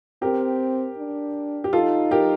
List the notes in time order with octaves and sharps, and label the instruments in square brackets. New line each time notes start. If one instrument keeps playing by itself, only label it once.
[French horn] C4 [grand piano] G4 A#4
[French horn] D4
[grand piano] G4
[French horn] D#4 [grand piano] F4 A4
[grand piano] G4 A#4